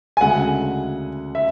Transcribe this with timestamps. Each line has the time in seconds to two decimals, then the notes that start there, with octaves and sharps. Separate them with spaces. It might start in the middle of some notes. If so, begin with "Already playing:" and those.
0.17 G#5
0.21 D2 C#3 G#3 F#5
1.35 E5